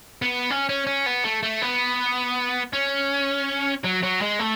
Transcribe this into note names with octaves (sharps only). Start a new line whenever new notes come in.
B3
C#4
C#4
C#4
B3
A3
A3
B3
C#4
F#3
F#3
G#3
A3